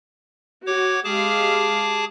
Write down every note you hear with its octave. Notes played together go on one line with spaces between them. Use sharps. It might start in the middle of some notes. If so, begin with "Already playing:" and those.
F#4 C#5 D6
G#3 G4 G#4 F5 A5 D6